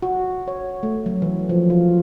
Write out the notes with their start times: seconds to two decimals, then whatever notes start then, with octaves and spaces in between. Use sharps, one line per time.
0.02 F#4
0.48 C#5
0.83 A3
1.06 F#3
1.22 E3
1.49 F3
1.70 F4